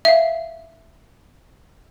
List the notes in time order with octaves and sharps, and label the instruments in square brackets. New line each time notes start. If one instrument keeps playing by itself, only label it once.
[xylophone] E5 F5